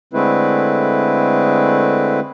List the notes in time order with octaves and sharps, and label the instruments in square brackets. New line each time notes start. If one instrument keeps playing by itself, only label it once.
[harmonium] D3 G#3 A3 C4 E4 B4